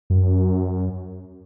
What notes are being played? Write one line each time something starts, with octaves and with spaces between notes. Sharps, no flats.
F#2